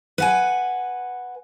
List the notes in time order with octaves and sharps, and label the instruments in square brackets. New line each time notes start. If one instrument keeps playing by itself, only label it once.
[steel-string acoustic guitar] B4 F#5 G#5